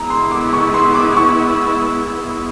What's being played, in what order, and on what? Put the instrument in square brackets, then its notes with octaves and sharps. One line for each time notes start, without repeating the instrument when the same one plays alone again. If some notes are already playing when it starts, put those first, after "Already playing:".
Already playing: [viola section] G#3 B3 E4 [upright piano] A#5
[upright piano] C6
D6
C#6
C6
D6
C#6